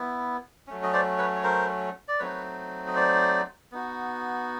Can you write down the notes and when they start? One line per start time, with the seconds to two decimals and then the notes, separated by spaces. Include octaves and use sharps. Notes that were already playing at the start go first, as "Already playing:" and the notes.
Already playing: B3 E4
0.67 F#3 A3 C#4
0.83 D#5
0.93 C5 D5
1.18 B4 C#5
1.36 C#5
1.43 A#4 C5
2.08 D5
2.20 F#3 A3 C4 D#4 B4 C#5
2.87 D#5
2.96 C5 D5
3.72 B3 D#4 F#4